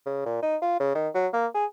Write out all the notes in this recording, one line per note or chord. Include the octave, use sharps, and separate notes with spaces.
C#3
A#2
D#4
F4
C#3
D#3
F#3
A#3
G#4